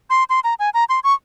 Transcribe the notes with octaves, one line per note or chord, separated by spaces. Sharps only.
C6
C6
A#5
G#5
A#5
C6
C#6